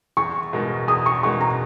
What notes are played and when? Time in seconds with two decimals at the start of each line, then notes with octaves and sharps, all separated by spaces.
0.17 E2 C#6
0.53 B2 G#3 D#4 A#4
0.87 E2 D#6
1.06 C#6
1.23 B2 G#3 D#4 A#4 C#6
1.41 A#5